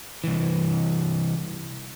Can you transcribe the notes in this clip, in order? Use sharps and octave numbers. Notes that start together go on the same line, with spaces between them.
C2 E3